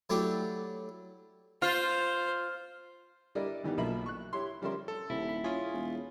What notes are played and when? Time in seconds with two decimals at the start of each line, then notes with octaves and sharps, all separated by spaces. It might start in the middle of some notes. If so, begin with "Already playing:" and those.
0.10 F#3 A3 D4 E4 G4
1.62 F4 C5
3.35 G3 D4 E4 A#4 D5 D#5
3.63 D#3 E3 G3 B3 D#4
3.77 B1 B2 F3 A#3 E5 B5
4.06 C#6 F#6
4.33 E4 G4 C#5 C6
4.62 F3 G3 C#4 A#4 E5 C6
4.88 A4
5.10 D#1 C3 E4
5.29 B5
5.44 C#4 F4 G#4
5.74 E1